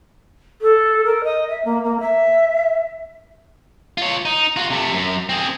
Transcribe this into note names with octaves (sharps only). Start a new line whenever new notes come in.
A4
A#4
D#5
E5
A#3
A#3
E5
F4 C#5
D#4
F4 F#4
C3 A3
F#2
C4 G#4